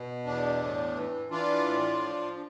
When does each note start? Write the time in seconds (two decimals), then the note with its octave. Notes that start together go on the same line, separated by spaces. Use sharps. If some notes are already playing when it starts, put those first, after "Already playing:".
Already playing: B2
0.25 E2 D4
0.60 A2
0.95 E3
1.31 E3 D4 F4
1.66 A2
2.02 F3